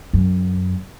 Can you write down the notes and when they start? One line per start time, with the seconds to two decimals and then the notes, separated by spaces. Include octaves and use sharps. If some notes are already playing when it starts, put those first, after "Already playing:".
0.13 F#2